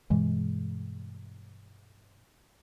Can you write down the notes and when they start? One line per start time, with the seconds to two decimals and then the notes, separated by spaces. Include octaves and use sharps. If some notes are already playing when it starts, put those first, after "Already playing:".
0.10 G2 B2 E3 G#3